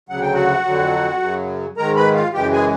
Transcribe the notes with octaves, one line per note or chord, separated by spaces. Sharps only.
D2 C#3 F#3 F#5
G5
F#4 F#5
F2 D3 F#3
F#2 C#3 F#3
G#2 D#3 G#3 A#4 A#5
B4 B5
F4 F5
F#2 C#3 E3 G#3 G4 G5
G#4 G#5